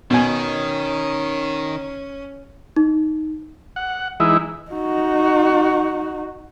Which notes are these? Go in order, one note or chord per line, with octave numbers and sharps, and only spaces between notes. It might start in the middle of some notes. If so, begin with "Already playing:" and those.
B2 D#3 C#4 G#5
D#4
F#5
E3 G#3 D#4 E4
D#4 F#4